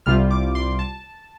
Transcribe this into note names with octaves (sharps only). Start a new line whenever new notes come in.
C2 C3 G3 F4 F6
D6
C6
A5